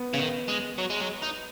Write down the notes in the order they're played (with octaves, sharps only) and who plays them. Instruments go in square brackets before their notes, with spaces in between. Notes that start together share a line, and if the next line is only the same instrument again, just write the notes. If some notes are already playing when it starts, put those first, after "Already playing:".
Already playing: [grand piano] B3
[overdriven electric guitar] C#3
D#3
G#3
F#3
G#3
F#3
D#4